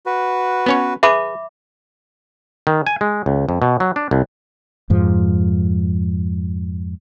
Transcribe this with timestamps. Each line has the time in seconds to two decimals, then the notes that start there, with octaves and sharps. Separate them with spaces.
0.06 F#4 B4
0.66 B3 C#4 C#5
1.03 G#4 B4 E5 B5 D6
2.67 D#3
2.87 G#5
3.01 G#3
3.26 C#2
3.49 F2
3.62 B2
3.80 F#3
3.96 D4
4.11 C2
4.90 F2 G#2 F3